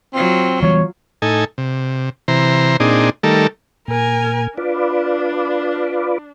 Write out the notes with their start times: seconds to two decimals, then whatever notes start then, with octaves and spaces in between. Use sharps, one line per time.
0.14 F#3 C4 F4
0.62 E3 G3 B3 C#5
1.22 A2 D#4 A4 G#5
1.58 C3
2.28 C3 E3 C5 A#5
2.80 A#2 C4 D4 D#4 G#4
3.23 D#3 G3 A3 A4 A#4
3.88 A#2 A#4 G#5
4.58 D4 F4 B4 D5